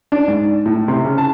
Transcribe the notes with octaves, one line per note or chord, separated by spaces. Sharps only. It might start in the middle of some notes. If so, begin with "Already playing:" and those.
D4
G#2
A2
C3
C#3
A5